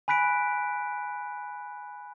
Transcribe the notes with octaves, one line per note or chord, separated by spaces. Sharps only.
G#5 B5 F#6 B6 D7